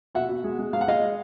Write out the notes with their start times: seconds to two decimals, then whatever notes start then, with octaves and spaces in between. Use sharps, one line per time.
0.15 B2 E5 F#5
0.29 B2
0.44 G#3
0.58 G#3
0.73 G#2 F5
0.81 F#5
0.87 G#3 D#5 F5